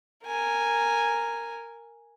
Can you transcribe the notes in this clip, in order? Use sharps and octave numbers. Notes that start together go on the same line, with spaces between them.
A#4 G#5